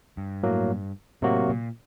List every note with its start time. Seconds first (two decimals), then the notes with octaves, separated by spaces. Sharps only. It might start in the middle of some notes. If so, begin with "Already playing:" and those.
0.17 G2
0.43 A2 F#3 A#3
1.22 A2 C3 F#3 A#3 F#4
1.49 A#2